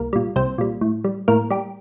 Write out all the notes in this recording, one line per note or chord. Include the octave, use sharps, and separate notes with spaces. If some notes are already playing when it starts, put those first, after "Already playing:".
Already playing: C2 A#3 A#4
A#2 G3
C2 C4 C5
A#2 G3
A2
G3
A2 A#3 A#4
G3 G4